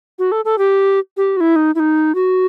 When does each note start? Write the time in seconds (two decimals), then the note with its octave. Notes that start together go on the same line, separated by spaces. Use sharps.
0.19 F#4
0.32 A4
0.45 A4
0.58 G4
1.17 G4
1.37 F#4
1.41 E4
1.56 D#4
1.75 E4
1.80 D#4
2.15 F#4